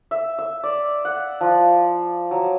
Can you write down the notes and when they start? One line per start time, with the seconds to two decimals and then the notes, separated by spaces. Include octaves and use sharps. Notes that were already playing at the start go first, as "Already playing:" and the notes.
0.11 E5
0.38 E5
0.64 D5
1.05 F#5
1.41 F3
2.31 F#3